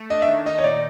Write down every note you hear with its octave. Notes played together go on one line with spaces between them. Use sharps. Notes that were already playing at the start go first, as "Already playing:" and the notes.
Already playing: A3
D4 D#5
E5
D#3
D#4 D#5
C#5
A#2 D5